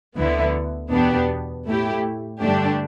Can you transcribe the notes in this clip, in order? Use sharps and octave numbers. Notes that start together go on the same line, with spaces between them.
D2 D3 B3 E4
E2 B2 B3 D4 G4
A2 A3 E4 G4
G2 D3 A3 D4 G4